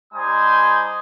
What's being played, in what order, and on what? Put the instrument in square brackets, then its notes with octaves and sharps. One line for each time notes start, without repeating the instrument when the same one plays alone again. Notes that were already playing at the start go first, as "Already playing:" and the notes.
[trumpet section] G3 D#4 C5 G#5 D#6